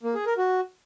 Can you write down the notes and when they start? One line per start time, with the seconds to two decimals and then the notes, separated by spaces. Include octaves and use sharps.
0.03 A#3
0.15 G#4
0.26 A#4
0.38 F#4